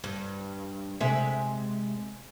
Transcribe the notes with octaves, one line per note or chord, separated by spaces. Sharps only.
G2
C3 G#3 E5